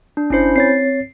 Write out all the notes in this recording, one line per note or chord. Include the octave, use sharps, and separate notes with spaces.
D4
G1 C#4 E4 C5 C7
C4 C#5 A6 C7